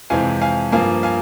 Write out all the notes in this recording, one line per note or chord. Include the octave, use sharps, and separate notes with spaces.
F2 C3 E3 G#3 C4 F5 G#5
F5 G#5
G2 F3 A#3 F5 G#5
F5 G#5